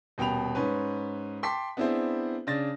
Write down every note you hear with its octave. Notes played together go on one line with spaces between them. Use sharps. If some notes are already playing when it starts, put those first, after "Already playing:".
D#1 B2 G5 B5 F7
G#2 C#4 B4
G5 A5 C6 D6 B6
B3 C4 D4 E4 G#4 C5
C#3 D4 A6 A#6